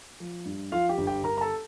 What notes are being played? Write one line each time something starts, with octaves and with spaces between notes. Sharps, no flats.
F3
G2
F3 F4 F5
G4 G5
G1
G4 G5
G1 A#4 A#5
A#5
A4 A5